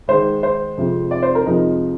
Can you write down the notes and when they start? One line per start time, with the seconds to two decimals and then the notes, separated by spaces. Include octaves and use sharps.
0.08 G#2 D#3 G#3 C5
0.43 C5
0.77 F2 C3 F3 G#3
1.11 D5
1.23 C5
1.35 A#4
1.45 F2 C3 F3 G#3 D#4